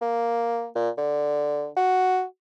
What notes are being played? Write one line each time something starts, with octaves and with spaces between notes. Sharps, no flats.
A#3
A#2
D3
F#4